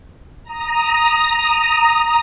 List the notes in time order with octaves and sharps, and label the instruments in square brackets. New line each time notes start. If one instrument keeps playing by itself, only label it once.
[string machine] A#5 D#6